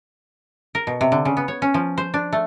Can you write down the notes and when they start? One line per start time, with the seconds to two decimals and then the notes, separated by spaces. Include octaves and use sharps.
0.75 A#4
0.87 B2
1.01 C3
1.12 D3
1.25 C#3
1.37 B3
1.48 C#5
1.62 C#4
1.74 F3
1.98 C5
2.14 D4
2.33 A3